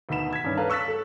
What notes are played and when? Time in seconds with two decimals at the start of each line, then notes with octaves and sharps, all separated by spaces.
0.09 D2 B2 D#3 B5 E7
0.33 G#6 B6
0.44 G2 D#3 C#4
0.57 A4 B4 C#5 F5 A5 A#5
0.70 C#6 E6 F#6 A6 B6
0.88 A4